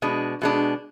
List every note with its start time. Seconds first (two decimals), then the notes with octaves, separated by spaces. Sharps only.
0.02 B2 G#3 D4
0.42 B2 G#3 D4